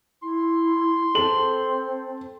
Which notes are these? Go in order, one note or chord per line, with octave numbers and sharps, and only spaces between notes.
E4 C6
C4 A4 F#7